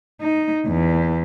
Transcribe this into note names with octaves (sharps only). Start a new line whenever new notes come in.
D#4
E2